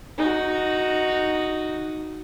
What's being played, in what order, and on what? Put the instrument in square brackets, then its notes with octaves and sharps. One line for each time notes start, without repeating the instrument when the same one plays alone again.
[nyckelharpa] D#4 F#4